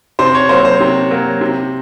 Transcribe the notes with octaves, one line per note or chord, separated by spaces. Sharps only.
C3 C5
C#5
F#3 A#3 C5
C5
C3
F#3 A#3
C3